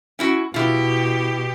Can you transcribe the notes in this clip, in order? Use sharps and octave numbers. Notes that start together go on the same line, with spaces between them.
C#4 E4 F#4
B2 E4 F4 G4